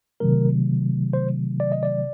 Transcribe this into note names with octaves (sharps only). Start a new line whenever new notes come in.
C3 D#3 F#3 A3 A#4
C5
D5
D#5
D5